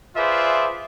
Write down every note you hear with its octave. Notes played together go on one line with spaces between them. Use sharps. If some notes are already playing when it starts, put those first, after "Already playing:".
F4 G#4 B4 C5 D5 E5